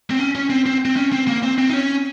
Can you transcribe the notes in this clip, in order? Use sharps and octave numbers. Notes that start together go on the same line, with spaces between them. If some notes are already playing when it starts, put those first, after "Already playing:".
C4
C#4
C#4
C4
C4
C4
C#4
C4
A#3
C4
C4
D#4
C#4